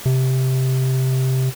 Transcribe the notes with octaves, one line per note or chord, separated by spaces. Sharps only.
C3